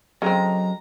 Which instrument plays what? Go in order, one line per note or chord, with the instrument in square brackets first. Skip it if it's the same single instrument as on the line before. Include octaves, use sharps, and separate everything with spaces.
[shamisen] C#3 C4 [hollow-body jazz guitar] F#3 A4 D#5 [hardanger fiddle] A#5